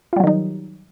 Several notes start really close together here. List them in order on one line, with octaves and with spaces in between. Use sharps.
F4 G3 F#3 D#3 D#4